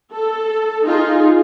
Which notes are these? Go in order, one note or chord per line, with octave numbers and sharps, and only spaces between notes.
A4
D#4 F4 G#4